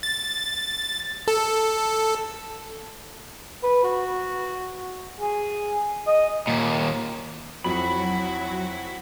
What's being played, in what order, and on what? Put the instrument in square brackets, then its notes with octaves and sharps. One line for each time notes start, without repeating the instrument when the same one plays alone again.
[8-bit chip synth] A6
A4
[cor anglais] B4
F#4
G#4
D#5
[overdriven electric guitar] D#2 A#2
[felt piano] F2 [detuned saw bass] F#3 [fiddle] E4 F#4 [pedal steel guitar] B5